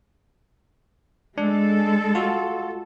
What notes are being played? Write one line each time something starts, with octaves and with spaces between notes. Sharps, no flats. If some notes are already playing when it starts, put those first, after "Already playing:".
G#3 D4 A4
F4 F#4